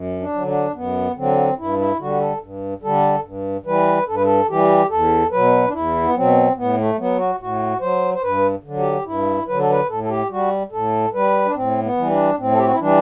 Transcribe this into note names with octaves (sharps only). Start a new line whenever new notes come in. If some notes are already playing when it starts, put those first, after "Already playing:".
Already playing: F#2
D4
D3 F#3
D4
F#2 B3
D3 F#3 C4
G2 E4
E4
D3 G3 F#4
A4
G2
D3 G3 A4
G2
E3 G3 B4
G2 A4
B4
A4
E3 G3 G4
E2 A4
B2 F#3 B4
D4
E2 E4
B3
B2 F#3 C4
A2 B3
A3
F#3 B3
F#4
A2 F#4
F#3 C5
C5
G2 B4
D3
F#3
G4
G2 E4
D3 F#3 B4
A4
B4
A2 A4
A4
G4
G3 F#4
A2 A4
G3 B4
D4
A2 C4
B3
E3 G3
D4
A2 C4
A4
G4
F#4
E4
E3 G3 D4